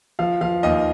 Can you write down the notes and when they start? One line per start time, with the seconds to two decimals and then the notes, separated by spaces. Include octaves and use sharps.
0.19 F3 F5
0.41 F3 F5
0.63 D#2 D#5